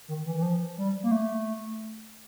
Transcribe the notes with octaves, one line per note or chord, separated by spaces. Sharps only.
D#3
E3
E3
F3
G3
A#3
A3